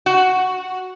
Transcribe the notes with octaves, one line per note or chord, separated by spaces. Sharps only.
F#4